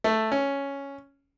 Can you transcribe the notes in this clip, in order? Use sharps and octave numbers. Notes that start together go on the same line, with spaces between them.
A3
C#4